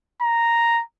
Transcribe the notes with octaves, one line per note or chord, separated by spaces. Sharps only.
A#5